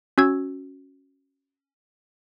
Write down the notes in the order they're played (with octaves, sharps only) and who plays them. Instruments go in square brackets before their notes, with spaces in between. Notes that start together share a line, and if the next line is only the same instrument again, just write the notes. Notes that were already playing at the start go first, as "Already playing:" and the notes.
[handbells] C#4 F#4 E6 G#6